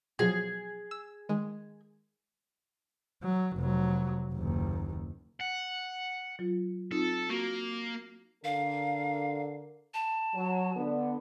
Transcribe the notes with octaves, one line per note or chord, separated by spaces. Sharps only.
B2 F3 F#3 G#4
E6
D#3 G#3
F#3
F1 F#3
F#1 D#2
F#5
F#3 F4
C4 D#4 F4 A4
A#3 F#4 C#6
D3 A#4 F5
A5
F#3
D3 B3